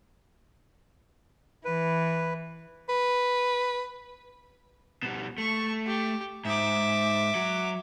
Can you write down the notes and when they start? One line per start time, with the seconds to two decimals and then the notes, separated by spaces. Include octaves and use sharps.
1.65 E3 B4
2.89 B4
5.03 B2 G3
5.38 A3 C#6
5.86 G4
6.45 G#2 E5 D6
7.35 F#3